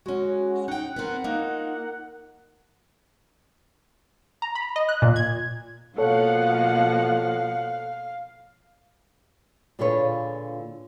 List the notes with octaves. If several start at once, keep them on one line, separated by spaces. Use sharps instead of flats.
G#3 C#4 F#4
D#4 F#5 G5
B3 C4 A#4
A#3 D#4 F4
A#5
B5
D#5
F#6
A#2
G#6
B2 F3 A#3 A4 C#5 F5 F#5
A#2 D3 F4 G#4 B4 C#5